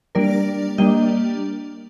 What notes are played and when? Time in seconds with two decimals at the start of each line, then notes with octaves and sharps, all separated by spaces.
0.15 G3 A#3 D4 A#4 D5
0.78 G3 A#3 D4 D#5 G5